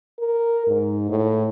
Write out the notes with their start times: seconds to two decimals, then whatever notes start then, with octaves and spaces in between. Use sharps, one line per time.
0.19 A#4
0.67 G#2
1.10 A2